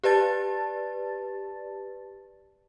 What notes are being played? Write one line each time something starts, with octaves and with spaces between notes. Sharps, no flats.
G4 B4 D5 A5 A6